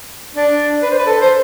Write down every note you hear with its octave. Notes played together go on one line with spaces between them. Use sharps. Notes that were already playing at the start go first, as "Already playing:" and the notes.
D4
B4
C5
B4
A4
C5